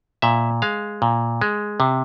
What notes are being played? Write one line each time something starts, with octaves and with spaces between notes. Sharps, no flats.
A#2 E5
G#3 F5
A#2
G#3
C3